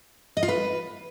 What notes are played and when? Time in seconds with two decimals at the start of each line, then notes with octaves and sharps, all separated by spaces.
0.37 D#5
0.43 F4
0.49 B4